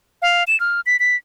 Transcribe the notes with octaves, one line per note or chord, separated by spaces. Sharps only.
F5
E7
F6
B6
B6